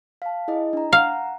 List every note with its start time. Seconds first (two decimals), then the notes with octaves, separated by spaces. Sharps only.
0.22 F5 A5
0.48 E4 G#4 D#5
0.73 D4 A#5
0.93 F5 F#5 A#5